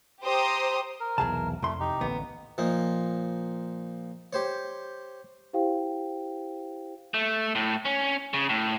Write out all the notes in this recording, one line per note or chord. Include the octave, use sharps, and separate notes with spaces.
G4 C5 A#5 D#6
A#4
B1 E2 C3 G#4 A5
C2 F2 A3 C6
D#4 G4
A1 D3 B3
A#2 F3 D#4
G4 C5 C#5
E4 G4 C5 F5 G5
A3
A2
C#4
C#3
A2